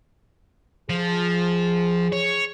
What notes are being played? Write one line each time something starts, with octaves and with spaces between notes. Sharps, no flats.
F3 G#4
C#5